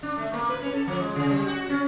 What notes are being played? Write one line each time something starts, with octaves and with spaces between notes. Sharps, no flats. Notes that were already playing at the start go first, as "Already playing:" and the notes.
D4
A3
A#3
B4
C#4
A4
F3
G#3
C#3
G3
F#4
C#4